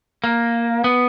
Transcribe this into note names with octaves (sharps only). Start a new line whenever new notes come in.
A#3
B3